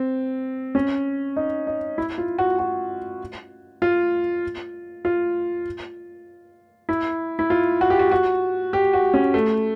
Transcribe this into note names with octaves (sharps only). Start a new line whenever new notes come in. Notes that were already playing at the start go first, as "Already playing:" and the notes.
Already playing: C4
C#4
D#4
D#4
E4
F4
F#4
F#4
F4
F4
E4
E4
F4
F#4
G4
F#4
F#4
G4
F#4
C#4
A3